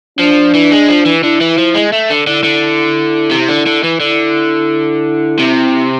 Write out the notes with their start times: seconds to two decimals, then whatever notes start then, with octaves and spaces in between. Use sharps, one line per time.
0.19 F3 D4
0.54 E3
0.71 G#3
0.88 F3
1.06 E3
1.24 D3 E4
1.41 E3
1.58 F3
1.75 G#3
1.93 A3
2.10 D3
2.27 D3 E4
2.44 D3
3.31 C3
3.49 D3
3.66 D3
3.84 E3
4.00 D3 E4
5.39 C3